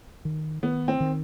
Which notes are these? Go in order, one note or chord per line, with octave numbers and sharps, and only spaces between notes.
D#3
D#3 B3
C4
D#3